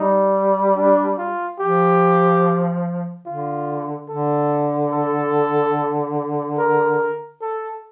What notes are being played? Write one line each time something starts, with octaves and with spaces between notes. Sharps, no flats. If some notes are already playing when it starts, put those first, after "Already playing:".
Already playing: G3 D#4
D4
F4
F3 G4
D3 F4
D3 A4
A4
A#4
A4